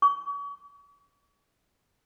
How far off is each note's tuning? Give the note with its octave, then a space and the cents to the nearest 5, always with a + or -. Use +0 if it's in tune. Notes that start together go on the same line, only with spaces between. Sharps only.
C#6 +40